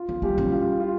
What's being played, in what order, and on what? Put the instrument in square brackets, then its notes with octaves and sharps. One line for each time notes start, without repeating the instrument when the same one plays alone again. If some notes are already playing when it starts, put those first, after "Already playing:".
Already playing: [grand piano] F4
[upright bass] C#4
[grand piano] G3 G4 [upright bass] E4
[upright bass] C#4
[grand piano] F4
F4